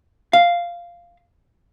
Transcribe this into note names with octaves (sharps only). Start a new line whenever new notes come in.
F5